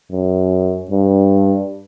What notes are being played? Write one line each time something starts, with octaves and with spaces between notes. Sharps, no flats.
F#2
G2